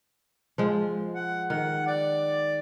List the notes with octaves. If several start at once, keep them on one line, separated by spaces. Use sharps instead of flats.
F3 G#3
F#5
D#3 F#5
D5